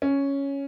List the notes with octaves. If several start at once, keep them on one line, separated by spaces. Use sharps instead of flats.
C#4